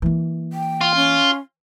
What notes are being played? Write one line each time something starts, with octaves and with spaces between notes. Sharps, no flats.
E3 A#3
G5
F4
C#4